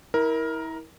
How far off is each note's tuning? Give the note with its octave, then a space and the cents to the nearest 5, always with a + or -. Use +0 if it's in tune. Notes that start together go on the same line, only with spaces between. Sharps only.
E4 -30 A#4 +10